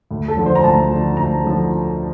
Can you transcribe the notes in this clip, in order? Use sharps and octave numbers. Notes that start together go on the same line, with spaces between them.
D2
A4
D3 F3
C5
A#5
D2 A5
D3 F3
D2 A#5
D3 F3